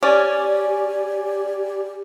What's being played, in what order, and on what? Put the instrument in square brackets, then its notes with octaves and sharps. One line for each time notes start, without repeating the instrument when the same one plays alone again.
[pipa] C#4 [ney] G4 [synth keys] D5 G#5